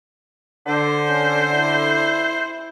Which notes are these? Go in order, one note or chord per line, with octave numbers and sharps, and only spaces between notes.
D3 C5
C#4
E4